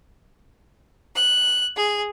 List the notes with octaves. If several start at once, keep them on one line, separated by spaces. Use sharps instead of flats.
F#6
G#4